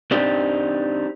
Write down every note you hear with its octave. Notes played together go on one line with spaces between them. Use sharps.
C4 D4 D#4 G4 D5